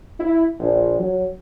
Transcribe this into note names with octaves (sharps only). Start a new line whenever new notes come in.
E4
A#1
F#3